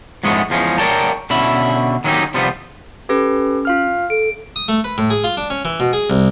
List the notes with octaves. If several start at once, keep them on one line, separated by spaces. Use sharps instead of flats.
F2 G#2 G#3 A3 B3 C#4
E2 F3 G#3 C4 C#4
A#4 C#5 D5 G5 A5 A#5
B2 D3 C#4 E5 B5
D#3 F#3 B3 C#4 D#4 G4
C3 F3 G3 B3
C#4 G4 A4 B4
F4 F5 F6
A4 D7
D#6
A3
B4
A2
G#4
F4
D4
C#4
E3
B2
G#4
C2